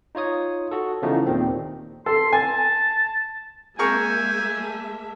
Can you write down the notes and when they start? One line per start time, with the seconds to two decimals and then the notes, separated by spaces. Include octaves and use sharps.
0.15 D#4 F4 C#5 D#6
0.71 F#4 A4
1.02 C#3 E3 F3 A3 B3 D#4
1.26 D#2 A#2 D#3 C4
2.06 A4 C6
2.33 G#5 A5
3.79 G#3 A#3 G#4 A#4 E5 G#5 C#6 G6
4.61 A5